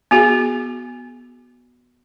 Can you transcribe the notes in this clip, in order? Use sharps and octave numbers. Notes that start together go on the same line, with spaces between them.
B3 F#4 G#4